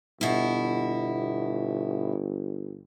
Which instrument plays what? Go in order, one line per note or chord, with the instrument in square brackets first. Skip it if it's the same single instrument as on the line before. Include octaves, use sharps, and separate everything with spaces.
[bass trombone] G1 [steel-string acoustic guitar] B2 E4